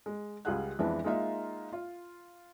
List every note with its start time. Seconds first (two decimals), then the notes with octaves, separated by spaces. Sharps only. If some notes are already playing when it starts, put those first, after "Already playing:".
0.06 G#3
0.45 C#2 G3 F4 G#4 F#5 F#6
0.79 F2 E3 G#3 B3 D4 E5
1.04 G#3 A#3 D#4 F4 D#5 E5
1.73 F4